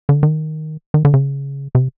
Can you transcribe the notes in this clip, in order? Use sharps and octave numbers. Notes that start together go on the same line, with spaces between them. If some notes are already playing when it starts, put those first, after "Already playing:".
D3
D#3
D#3
D3
C#3
C3